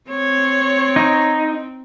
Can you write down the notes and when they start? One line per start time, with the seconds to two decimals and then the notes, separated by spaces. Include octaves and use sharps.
0.11 C4 C#5
0.96 D#4